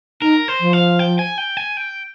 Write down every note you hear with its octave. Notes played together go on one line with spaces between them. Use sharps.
D#4 A#4
C5
F3
F5
G5
G#5
G5
G#5
G5